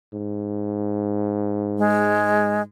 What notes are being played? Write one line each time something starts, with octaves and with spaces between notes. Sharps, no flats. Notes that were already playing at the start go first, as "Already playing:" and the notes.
G#2
G#3